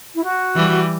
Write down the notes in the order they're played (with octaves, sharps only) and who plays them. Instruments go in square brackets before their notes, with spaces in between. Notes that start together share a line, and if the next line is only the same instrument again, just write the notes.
[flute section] E4
F#4
[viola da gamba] E3 G3